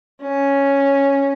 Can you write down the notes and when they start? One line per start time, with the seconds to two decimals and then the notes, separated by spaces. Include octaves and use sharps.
0.22 C#4